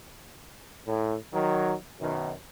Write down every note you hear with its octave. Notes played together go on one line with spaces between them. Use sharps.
A2
D#3 F#3
F#2 B2 D#3